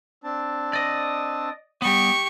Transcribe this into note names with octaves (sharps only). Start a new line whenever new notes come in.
C4 D4 A5
D5 D#5
G3 B3 G4 C#6